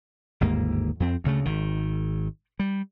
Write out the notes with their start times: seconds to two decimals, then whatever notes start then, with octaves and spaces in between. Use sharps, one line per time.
0.41 G1 D#2 G#2 A#3
1.00 F2 C4
1.24 D2 C#3 A3
1.45 G#1 D#3
2.59 G3